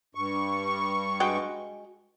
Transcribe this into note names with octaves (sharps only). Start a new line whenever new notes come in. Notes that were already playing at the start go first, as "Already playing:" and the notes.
G2 C#6
G#3 F#4 G5